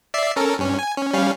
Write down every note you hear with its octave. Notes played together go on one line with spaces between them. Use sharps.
D5 E5 C7
C#4 A4 A#4
G2 C#4
G#5
C#4
G3 C#4 F5